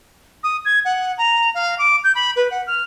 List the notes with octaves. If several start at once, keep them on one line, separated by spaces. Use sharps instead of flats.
D#6
G#6
F#5
A#5
F5
D6
G6
B5
B4
F#5
F6